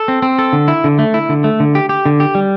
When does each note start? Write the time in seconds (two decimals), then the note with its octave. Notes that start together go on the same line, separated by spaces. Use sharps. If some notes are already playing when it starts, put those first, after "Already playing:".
Already playing: A4
0.08 C4
0.22 C4
0.39 A4
0.53 D3
0.68 E4
0.84 D3
0.99 A3
1.14 E4
1.29 D3
1.44 A3
1.60 D3
1.75 G4
1.89 G4
2.06 D3
2.20 G4
2.35 G3